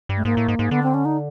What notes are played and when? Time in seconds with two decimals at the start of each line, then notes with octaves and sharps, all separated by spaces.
0.09 G2
0.17 A3
0.25 G#2 A#3
0.37 A2
0.48 G#2
0.59 G#2
0.71 D3 B3
0.83 C4
0.94 C#4
1.05 D#4